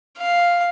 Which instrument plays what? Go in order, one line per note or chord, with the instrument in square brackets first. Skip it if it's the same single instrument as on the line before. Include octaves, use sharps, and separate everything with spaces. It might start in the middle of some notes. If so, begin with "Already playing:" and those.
[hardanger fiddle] F5